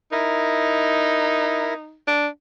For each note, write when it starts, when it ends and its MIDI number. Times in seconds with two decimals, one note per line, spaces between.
0.12 1.97 63
0.12 1.74 64
0.12 1.74 70
2.07 2.27 62